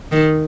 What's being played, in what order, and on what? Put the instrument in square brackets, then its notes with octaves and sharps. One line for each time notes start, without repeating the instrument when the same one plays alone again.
[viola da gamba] D#3